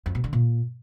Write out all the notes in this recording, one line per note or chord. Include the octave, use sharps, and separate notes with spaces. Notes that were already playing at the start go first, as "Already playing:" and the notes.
F2
B2
D3
A#2